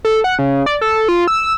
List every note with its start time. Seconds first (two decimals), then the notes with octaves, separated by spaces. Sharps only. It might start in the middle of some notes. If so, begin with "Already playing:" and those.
0.05 A4
0.24 F#5
0.39 C#3
0.66 D5
0.81 A4
1.08 F4
1.28 E6